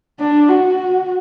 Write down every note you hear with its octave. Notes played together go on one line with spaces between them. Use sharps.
D4
F#4